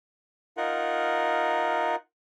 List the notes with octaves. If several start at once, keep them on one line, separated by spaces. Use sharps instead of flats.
D#4 F4 A#4 F#5